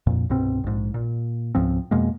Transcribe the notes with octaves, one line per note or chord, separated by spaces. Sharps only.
F2 A#2
C2 G2 B2 C4
A#1 G#2
A#2
C#2 G#2 F3 C4
F2 B2 G#3 A#3